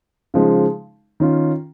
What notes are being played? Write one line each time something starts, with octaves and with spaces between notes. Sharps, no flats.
C#3 F3 G#3 D#4
D#3 C#4 F4